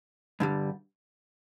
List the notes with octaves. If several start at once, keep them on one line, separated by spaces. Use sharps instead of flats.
G2 D3 G3